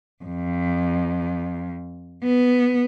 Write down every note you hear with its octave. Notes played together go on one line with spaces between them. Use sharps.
F2
B3